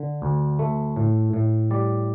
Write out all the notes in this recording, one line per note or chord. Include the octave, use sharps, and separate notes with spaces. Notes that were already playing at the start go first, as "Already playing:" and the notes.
Already playing: D3
D2
A3
A2
A2
G3 D5